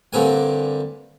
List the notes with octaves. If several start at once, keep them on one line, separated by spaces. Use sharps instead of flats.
G2 D3 C4 A#4 G#5